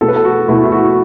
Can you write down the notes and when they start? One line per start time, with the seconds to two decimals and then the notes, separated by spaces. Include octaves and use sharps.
0.01 B2 A3 A4
0.08 B4
0.16 A4
0.24 F#4
0.48 B2 A3 E4
0.64 E4
0.72 F#4